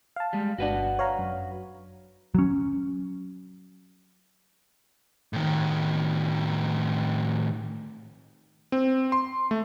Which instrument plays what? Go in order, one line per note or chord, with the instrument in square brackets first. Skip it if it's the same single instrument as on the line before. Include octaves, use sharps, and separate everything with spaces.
[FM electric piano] F5 A5
[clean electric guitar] G3 G#3
[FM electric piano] G1 D4 [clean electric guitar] F#4 B4 F#5
[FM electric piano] C#5 F5 A#5
F#2
[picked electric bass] F#3 C#4
[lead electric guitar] A2 D#3
[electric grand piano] C4
C6
A3